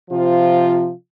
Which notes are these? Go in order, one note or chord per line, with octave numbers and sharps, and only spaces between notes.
C3 F3 F4